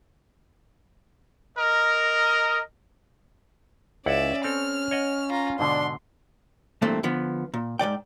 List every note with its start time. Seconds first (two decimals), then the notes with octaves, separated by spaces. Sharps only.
1.58 A#4 D#5
4.06 C#2 C#4 E4 D5 E5 F#5
4.44 C4 A4 F6
4.91 C#5 D#5 F#5
5.30 F4 A#5
5.59 G#2 B2 D3 D4 C6
6.82 G2 A#2 E3 A3 C4
7.03 D3 F3 B3
7.54 A#2
7.79 G#2 D#3 D5 G5